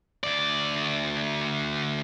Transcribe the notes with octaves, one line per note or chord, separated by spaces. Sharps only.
D2 D5